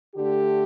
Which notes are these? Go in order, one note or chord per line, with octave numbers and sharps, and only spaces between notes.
D3 A3 G4